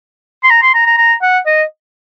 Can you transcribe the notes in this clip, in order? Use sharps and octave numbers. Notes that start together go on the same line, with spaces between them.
C6
A#5
C6
A#5
A#5
A#5
F#5
D#5